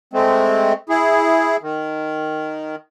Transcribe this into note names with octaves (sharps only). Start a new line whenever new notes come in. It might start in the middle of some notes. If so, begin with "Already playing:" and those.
G#3 A3 C4
E4 G#4
D#3